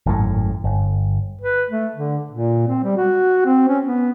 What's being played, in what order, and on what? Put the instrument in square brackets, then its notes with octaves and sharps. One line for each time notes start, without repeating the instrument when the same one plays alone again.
[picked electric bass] G#1 F#2 A2
G1
[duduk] B4
A3
D3
A#2
C4
G3
F#4
C4
C#4
B3